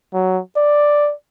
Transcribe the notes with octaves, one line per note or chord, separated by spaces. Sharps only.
F#3
D5